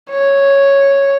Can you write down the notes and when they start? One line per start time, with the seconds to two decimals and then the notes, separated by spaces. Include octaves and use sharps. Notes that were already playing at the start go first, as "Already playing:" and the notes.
0.10 C#5